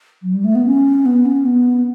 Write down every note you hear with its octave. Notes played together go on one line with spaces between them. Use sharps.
F#3
G3
A3
B3
C#4
B3
C#4
B3